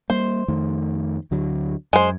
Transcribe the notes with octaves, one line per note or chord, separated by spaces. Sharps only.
G3 A#3 C5
F2 D#3 A3
D2 D3 F#3
F#2 G#3 C5